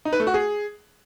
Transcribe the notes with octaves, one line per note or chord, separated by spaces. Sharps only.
D#4
B4
A3
F#4
G#4